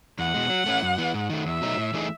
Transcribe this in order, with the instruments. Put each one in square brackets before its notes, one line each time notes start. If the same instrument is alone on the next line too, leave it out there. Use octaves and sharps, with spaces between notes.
[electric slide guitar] E2 [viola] F#5
[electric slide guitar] B2 G#3
F#3
A3 C#4 E4
F#2
E3 B3
G#2
D#3 A3
[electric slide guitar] E2 [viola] E5
[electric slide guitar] B2 F#3 A3 D#4
A2
E3 A3 D#4 G#4